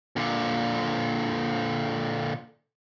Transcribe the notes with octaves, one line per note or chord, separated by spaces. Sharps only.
A#2 D3